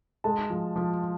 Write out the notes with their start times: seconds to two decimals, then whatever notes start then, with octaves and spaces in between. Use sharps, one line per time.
0.24 G#3 A5
0.50 F3
0.76 F3